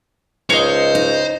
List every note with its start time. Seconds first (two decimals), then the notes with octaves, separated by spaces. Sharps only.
0.50 C#2 D#4 C5 C#5 D#5
0.95 D#4